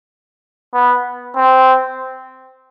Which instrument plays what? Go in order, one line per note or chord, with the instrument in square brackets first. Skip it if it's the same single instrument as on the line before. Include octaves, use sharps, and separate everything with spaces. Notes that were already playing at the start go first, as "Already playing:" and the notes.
[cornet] B3
C4